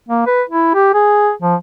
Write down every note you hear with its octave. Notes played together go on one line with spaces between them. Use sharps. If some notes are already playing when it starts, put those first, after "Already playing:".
A#3
B4
E4
G4
G#4
F3